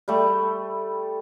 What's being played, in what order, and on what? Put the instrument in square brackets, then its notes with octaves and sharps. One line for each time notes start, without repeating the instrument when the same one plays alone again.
[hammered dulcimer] G3 A3